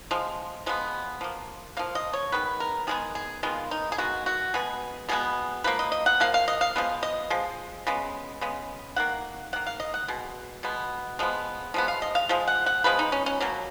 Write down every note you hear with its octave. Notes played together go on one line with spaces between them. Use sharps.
F3 G#3
F3 G#3 B3
F3 A#3
F3 A#3 F5
D#5
C#5
D#3 G#3 B3 B4
A#4
D#3 G#3 B3 G#4
G#4
D#3 G#3 B3 F4
D#4
G#4
D#3 G#3 B3 F#4
F#4
B2 G#3 B3 G#4
B2 G#3 B3 G#4
F3 A#3 B4
D#5
D#5
F#5
F3 A#3 F5
F5
D#5
F5
F3 G#3 B3
D#5
F3 G#3
C#3 G#3 B3
C#3 G#3 B3
D#3 A#3 F#5
D#3 A#3 F#5
F5
D#5
F#5
B2 G#3
B2 G#3 B3
F3 G#3 B3
F3 G#3 B3
F5
D#5
F5
F3 G#3
F#5
F#5
F3 G#3 B3 B4
D#4
C#4
C#4
B2 F#3 A#3